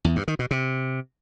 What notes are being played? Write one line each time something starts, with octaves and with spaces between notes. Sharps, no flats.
E2
G2
D#3
B2
C3